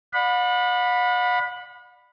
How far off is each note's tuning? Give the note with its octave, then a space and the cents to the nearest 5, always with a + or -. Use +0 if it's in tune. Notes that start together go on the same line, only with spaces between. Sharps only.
D5 +30 F#5 -40 B5 +0